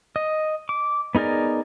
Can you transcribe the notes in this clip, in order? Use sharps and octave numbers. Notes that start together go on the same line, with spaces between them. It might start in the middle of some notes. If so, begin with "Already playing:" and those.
D#5
D6
B3 D#4 G#4 A#4 D5